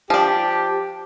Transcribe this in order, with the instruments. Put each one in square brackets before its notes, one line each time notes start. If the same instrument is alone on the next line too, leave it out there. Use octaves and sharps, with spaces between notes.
[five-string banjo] F3 D4 [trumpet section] G4